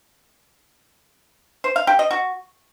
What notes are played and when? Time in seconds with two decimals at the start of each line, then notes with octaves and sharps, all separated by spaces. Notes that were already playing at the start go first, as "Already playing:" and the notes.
1.64 C5
1.76 F5
1.87 G4
1.99 D#5
2.11 F#4